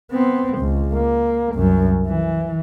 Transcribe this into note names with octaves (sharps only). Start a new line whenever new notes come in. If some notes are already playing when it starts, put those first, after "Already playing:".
B3 C4
C#2
A#3
C2 F#2
E3